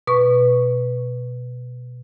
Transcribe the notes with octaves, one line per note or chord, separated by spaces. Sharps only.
B2 B4 C#6